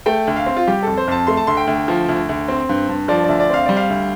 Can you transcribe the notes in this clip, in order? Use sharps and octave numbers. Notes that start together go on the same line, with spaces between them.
A3 G5
D2
F5
C4
F4
G3 G4
F2 A4
C5
F2 A5
A3 C6
A5
D2 C6
G5
D2
F3
D2
D2
C4
G2
G2
F3 D5
D2 D5
D5
C4 F5
G3 D5
F5
D2